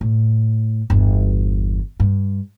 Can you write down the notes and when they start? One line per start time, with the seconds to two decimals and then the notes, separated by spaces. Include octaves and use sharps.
0.01 A2
0.90 G1 E2
2.00 G2